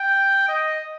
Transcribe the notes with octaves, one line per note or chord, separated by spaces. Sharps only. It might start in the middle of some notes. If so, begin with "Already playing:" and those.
Already playing: G5
D#5